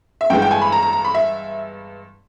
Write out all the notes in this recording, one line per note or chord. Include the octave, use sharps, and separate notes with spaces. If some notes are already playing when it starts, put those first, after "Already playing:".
E5
G2 E3 G#3 B3 G5
G5
G#5
B5
A#5
A#5
A#5
B5
E5